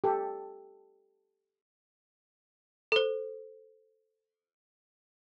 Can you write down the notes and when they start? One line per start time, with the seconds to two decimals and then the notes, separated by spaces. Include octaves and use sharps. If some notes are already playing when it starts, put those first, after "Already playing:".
0.04 G4 A4
2.92 A4 C5